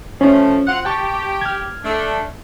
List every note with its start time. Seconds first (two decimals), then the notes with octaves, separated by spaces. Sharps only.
0.21 F3 A3 C#4
0.67 C4 F4 F#5
0.85 G4 G5 A5 C#6
1.41 F6 G#6
1.84 A3 D4